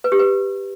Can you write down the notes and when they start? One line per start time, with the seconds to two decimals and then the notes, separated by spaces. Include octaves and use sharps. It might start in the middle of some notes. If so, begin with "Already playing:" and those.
0.04 B4
0.12 G4
0.19 B4